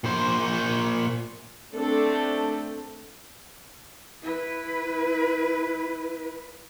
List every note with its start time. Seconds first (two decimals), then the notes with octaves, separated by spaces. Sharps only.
0.04 A#2 C5
1.74 A3 C4 D4 A4
4.22 E4 B4